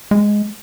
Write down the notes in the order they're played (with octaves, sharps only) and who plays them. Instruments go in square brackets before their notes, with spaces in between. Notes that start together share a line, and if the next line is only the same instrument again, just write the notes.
[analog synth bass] G#3